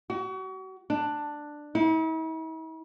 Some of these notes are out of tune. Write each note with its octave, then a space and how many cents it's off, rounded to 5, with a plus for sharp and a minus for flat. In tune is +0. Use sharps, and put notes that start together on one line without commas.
F#4 +35
D4 +10
E4 -45